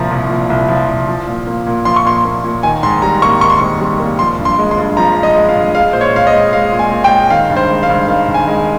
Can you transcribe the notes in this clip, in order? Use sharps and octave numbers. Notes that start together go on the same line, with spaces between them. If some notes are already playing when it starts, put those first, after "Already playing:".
Already playing: C2 A#2 F3 A#5
C2
A#2
C2
F3
C2
F3
A#2
A#3
A#2
F3 C6
C#6
A#2 C6
A#3
A#2
D#3 G#5
G#2 C6
G3 A#5
A#3 C#6
D#3 C#6
C6
G#2 C#6
G3
A#3
F3 C6
G2
C6
G#3
C6
G2
F3 A#5
G2
D#5
G#3
F5
G2
G#3 F5
A#2 C5
C#5
A#2 F5
D#5
G#3
G#3 F5
A#2
G#5
A#2
G5
G#3
D#3 F5
G2
C5
G#3
F5
G2
D#3 F5
G2
G#5
G#3